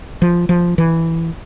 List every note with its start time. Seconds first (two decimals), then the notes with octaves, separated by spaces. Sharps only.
0.22 F3
0.49 F3
0.78 E3